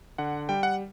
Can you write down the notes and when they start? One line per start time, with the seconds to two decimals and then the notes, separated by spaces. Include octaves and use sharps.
0.18 D3 F#5
0.49 G3 G5
0.63 F#5